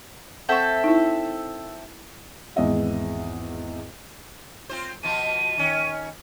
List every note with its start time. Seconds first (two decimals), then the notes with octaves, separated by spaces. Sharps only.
0.49 C4 A4 E5 F#5 C#6
0.84 D#4 E4
2.56 G#1 E2 G#3 B3 D#5 E5
4.69 C4 F4 C5
5.03 B2 F3 F4 D#7
5.58 D#3 C#4